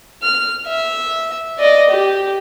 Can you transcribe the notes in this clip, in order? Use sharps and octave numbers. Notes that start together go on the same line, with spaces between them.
F6
E5
D5 D#5
G4